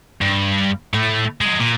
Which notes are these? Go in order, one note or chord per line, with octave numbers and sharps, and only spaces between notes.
G2
A2 A3
F#3 G#3
A#2